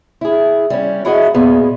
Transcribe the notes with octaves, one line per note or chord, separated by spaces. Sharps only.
E4 G#4
G3 C#4
E4 F#4 G#4 D#5 E5 F#5
A#2 B3 G#4